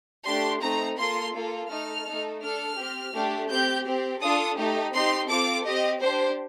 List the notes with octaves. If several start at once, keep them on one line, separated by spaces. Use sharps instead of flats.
A3 D4 G4 C6
A3 C4 D#4 A#5
A#3 F4 A4 C6
A#3 F4 A4
A3 D#4 A4 F6
A3 D#4 A4
D4 A4 F6
C4 G4
A3 D4 G4
C4 G4 G6
C4 G4
D4 F4 A4 D#6
A3 D#4 G4
C4 D#4 G4 C6
C4 F4 A4 D6
C4 G4 D#5
D4 G4 C5